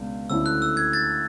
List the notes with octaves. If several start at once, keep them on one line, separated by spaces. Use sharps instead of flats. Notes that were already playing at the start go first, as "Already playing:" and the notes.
Already playing: C#2 B2 G#3 D4
D2 D3 A3 C#4 E4 E6
F#6
E6
G#6
A6